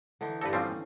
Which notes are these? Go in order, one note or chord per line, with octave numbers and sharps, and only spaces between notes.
D3 E3 D#4
G2 A4 B4 D5 A#5
F3 G3 C4 C#4